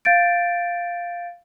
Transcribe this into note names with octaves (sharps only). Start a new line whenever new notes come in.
F5 G6 A6 D7